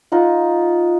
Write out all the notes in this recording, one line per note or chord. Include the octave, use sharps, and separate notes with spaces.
D#4 F4 F#5